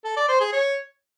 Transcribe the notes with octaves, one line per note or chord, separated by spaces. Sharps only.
A4
D5
C5
G#4
C#5